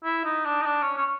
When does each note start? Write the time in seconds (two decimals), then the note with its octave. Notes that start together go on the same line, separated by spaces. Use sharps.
0.04 E4
0.25 D#4
0.45 D4
0.62 D#4
0.66 D4
0.82 C#4
0.97 C#4